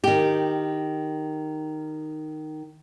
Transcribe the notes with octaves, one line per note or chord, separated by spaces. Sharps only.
D#3 G4